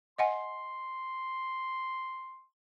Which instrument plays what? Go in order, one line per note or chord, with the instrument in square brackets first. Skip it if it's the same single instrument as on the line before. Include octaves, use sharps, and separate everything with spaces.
[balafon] D#5 F#5 G#5 [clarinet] C6